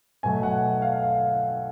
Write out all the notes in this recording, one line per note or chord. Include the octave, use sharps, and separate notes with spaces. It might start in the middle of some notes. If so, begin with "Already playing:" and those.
B2 F#3 A3 G#5
F#5
F5
F5